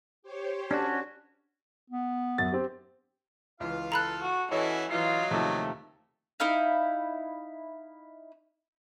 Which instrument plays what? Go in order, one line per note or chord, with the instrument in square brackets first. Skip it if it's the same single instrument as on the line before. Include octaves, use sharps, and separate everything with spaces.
[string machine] G4 C5 C#5
[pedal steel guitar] C#4 F#4 [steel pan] D4
[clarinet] B3
[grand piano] F#2 F#3 A6
C4 G4
[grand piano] C#2 E3 [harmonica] F4 F5
[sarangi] A4 [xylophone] A#5 B5 F#6
[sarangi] F#4
[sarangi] E3 [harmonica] C#4 E4 F#4 [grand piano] A4 C#5 D#5
[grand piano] E3 C7 [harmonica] F#3 D#4 [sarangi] F4
[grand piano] D#2 C3 F3 [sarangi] A3
[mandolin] D#4 E4 F5